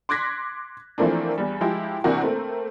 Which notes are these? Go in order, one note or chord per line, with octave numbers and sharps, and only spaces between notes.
C6 D6 F#6 G#6 A#6 B6
E3 F3 A3 A#3 C4 D4
E2 G3
F3 G#3 E4 G4
G2 C3 E3 A#3 D4 F#4
A3 A#3 C4